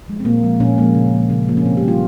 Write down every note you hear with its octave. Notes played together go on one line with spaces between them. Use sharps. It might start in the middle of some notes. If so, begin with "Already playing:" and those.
F3 G#3
C4
A#2 A#3
F3 G#3
A#2 C#4
F3 G#3 A#3
C#3
F3 A#3
C#3
F3 A#3
C#4
C3 C4
G4
G3 A#3
F4